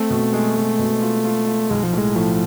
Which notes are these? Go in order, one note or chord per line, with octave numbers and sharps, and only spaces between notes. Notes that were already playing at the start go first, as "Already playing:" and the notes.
Already playing: A3 C4
B2
G#3
G#3
B2
F4
F4
F4
B1 G#3
F3
A2 G#3
A2 F3